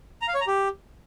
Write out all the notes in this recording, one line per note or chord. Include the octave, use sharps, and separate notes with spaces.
A#5
F5
C#5
A#5
G4